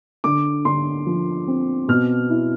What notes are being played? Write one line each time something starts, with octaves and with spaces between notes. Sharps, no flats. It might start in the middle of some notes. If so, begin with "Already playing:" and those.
D3 D6
D3 C6
F3
C4
B2 F6
E4